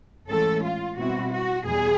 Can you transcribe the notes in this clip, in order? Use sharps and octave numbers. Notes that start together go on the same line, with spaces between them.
A2 E3 G#3 C#4 A4
F4
B2 G3 C4 E4 F#4
F#4
E2 B2 G3 G#4